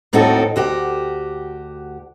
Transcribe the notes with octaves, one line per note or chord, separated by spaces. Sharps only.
D#2 A2 C4 D#4 F#4 A4
D2 F#4 G4